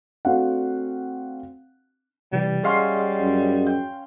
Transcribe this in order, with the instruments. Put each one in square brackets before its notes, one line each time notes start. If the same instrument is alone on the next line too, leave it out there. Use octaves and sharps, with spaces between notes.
[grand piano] A3 C4 D4 F#4 F5 F#5
[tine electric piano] C3 E3 [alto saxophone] G3
[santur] C#4 F5 C6 [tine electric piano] G#4 D#5 F#5
[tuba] F#2
[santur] G5